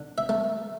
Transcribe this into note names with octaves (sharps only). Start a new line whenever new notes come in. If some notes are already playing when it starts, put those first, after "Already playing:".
Already playing: D3
E5
A3